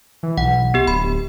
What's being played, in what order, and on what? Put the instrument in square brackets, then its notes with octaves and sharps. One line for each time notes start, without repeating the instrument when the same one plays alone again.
[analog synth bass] E3
[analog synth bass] B1 [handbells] F#5
[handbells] B3 G4
[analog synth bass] D1 [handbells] B5